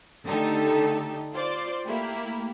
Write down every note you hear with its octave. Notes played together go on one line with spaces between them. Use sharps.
D3 A3 D#4 G4 A4
F4 C5 D5 C6 D6
A3 A#3 E4 G4